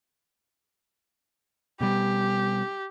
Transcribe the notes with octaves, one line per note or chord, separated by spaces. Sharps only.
B2 G3 G4